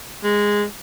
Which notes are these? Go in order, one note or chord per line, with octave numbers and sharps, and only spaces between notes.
G#3